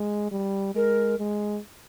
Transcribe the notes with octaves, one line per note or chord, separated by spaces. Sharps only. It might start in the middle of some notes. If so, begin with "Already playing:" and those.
Already playing: G#3
G3
G#3 A#4
G#3